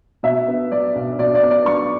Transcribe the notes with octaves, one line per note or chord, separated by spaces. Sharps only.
B2 E5
B3
F#3 D5
B1
B2 D5
D5
B3
D5
F#3 C#6